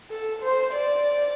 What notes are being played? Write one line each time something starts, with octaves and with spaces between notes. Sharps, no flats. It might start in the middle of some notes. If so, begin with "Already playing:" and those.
A4
C5
D5